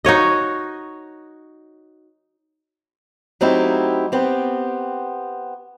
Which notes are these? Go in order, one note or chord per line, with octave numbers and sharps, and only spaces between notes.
D#4 F#4 C#5 D#5
F#3 A3 C4 D#4 E4 G4
B3 C4 G4